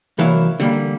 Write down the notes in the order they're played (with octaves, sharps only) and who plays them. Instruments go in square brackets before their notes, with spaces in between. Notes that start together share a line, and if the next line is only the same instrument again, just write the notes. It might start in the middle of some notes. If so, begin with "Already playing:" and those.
[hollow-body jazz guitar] C2 E3 F#3 A#3 E4 F5
D3 G3 A#3